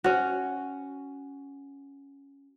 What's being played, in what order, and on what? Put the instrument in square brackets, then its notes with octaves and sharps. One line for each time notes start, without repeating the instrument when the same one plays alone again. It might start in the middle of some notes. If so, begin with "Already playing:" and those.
[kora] C#4 F#4